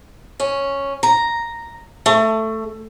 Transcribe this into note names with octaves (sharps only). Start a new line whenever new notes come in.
C#4
A#5
A3